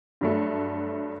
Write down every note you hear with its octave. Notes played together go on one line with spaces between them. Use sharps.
G2 F#3 A3